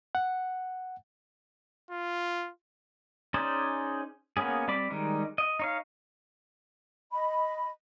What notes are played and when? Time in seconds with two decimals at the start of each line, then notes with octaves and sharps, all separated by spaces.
0.15 F#5
1.90 F4
3.34 C#4 D#4 G#4 C5 D5
4.37 A#3 B3 C#4 G#4
4.68 G3 C4 D5 B5 D6
4.90 D#3 G3 G#3 D#4
5.38 D#5
5.60 D#4 C#5 F5
7.11 D#5 B5